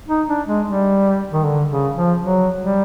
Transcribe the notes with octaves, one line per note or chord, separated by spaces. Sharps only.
D#4
D4
G#3
G3
D#3
D3
C#3
F3
F#3
G3